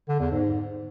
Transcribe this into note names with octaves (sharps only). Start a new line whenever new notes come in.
D3
E2
G#2